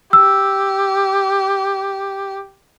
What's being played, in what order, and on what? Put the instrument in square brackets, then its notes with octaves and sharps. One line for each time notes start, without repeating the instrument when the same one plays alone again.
[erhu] G4 [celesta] E6